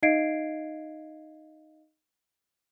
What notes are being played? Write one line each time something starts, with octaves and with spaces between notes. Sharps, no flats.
D#4 D#5 F5 G#6 C7 D7